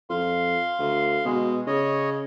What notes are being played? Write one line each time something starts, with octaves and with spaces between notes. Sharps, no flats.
F2 F5 C6
D2
B2 G#3 G#4
C#3 C#5 D#5